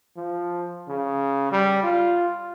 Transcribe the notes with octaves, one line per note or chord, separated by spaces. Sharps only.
F3
C#3
G3
F4